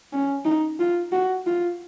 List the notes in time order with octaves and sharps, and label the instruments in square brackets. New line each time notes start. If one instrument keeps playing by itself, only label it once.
[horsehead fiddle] C#4
D#4
F4
F#4
F4